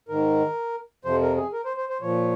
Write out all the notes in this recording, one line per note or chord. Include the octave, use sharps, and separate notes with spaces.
G#2 D#3 A#4
F2 C3 F3 C5
A#4
G#4
A#4
C5
C5
C5
A#2 F3 C#5